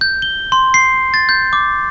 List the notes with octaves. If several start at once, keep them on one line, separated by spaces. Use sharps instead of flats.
G6
G7
C6
C7
A6
G6
D6